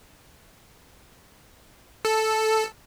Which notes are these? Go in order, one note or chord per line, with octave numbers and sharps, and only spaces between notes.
A4